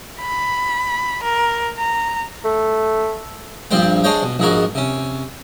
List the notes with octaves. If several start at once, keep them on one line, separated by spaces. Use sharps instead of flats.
B5
A#4
A#5
A3
A#1 G2 G3 C4 C5 G5
D4 G#4 C5 C#5 D#5 G5
B2
A#1 G#2 G#3 F#4 A#4
C3 C#4